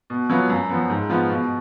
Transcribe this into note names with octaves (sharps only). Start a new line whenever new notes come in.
B2
F#3 B3 F4
F#2
F3 B3
G#2
F3 B3 F4
B2